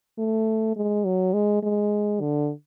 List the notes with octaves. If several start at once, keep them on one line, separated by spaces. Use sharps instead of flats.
A3
G#3
F#3
G#3
G#3
D3